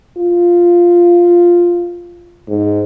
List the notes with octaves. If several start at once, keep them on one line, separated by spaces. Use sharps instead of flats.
F4
G#2